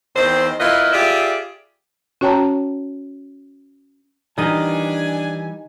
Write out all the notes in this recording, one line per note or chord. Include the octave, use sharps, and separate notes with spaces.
E2 D#3 C4 C5
A#3 E4 F4 B4 D#5
F4 G4 G#4 D5 E5
C#4 F#4 C#5 G5 A5 A#5
D#3 E3 G3 D4 D#5 G#5